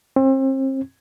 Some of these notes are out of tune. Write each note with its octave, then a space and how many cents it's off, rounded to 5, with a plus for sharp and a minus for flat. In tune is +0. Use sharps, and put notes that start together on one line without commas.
C4 +35